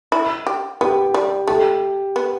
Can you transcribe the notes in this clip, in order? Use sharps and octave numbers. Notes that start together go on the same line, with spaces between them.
E4
G4
B3 G4
G3
A3 G4
B3